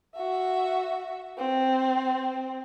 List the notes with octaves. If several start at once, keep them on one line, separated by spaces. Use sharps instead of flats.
F#4 E5
C4